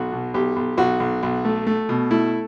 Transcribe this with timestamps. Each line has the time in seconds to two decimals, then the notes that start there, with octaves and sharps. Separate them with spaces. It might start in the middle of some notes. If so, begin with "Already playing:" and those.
Already playing: B1 F#4
0.12 B2
0.34 B1 G4
0.56 B1
0.77 B1 F#4
1.00 B1
1.23 B1
1.45 A3
1.67 A3
1.89 B2
2.10 A3 E4